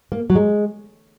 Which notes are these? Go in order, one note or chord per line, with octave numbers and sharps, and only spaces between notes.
A#3
F#3
G#3